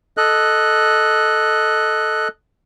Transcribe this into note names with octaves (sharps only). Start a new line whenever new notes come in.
A4 D#5 F#6